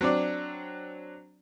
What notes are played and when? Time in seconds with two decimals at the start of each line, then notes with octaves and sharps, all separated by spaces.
0.01 F#3 C4 D4 D5